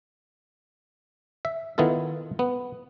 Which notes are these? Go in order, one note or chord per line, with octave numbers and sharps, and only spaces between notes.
E5
D#3 B3 E4 F4 A4
B3